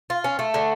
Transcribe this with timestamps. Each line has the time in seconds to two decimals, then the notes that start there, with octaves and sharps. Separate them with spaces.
0.10 F4
0.24 C#4
0.39 A3
0.54 D3